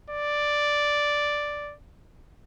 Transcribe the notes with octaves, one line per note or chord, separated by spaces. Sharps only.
D5